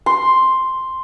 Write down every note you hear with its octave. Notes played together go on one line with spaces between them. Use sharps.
C6